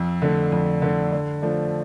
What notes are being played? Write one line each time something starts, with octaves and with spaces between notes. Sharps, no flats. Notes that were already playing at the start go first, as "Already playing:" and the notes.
Already playing: F2
D3 A3
F2
D3 A3
D3
F3 A3 D4